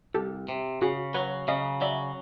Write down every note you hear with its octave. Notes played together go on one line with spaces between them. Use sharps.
C2 G4 A4
C3
C#3 F#4 G#4
F#3 B4 C#5
C#3 D#5 F5
F#3 D5 E5